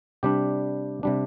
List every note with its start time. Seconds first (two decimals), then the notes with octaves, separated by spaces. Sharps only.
0.23 C3 G3 D4 G4
1.03 C3 G3 D4